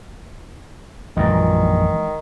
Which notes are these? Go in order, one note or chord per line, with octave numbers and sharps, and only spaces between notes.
A#1 F#2 A#2 D#3 E3 G#3